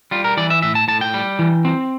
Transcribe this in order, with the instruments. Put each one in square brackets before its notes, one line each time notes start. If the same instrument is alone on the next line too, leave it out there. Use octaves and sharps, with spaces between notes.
[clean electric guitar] G3 F4
A#4
E3 D5
E5
A2 E5
A5
A2 A5
G5
G3
E3
C4